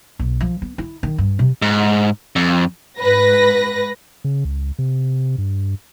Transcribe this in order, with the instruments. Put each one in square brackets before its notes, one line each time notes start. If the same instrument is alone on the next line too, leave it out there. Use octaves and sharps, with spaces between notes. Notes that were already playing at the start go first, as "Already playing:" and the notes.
[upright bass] B1
F3
B3
E4
D#3
G2
C3
[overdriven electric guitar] G#2
F2
[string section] G#2 B4 A#6
[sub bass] C#3
C#2
C3
G2